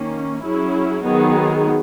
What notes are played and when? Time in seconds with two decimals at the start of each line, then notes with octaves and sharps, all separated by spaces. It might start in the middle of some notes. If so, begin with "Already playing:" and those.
Already playing: D#3 A#3 C#4
0.42 F#3 C#4 E4 G#4
1.04 D#3 F#3 B3 D#4 G#4